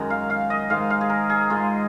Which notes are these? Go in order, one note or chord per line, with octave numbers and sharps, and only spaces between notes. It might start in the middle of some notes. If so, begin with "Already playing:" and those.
Already playing: F#2 D#3 G#3
F5
F5
D#5
G#2 D#3 G#3 F5
F5
G#4
A#4
G#4
G#2 D#3 G#3 F4